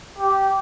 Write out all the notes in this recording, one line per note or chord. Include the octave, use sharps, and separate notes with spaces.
G4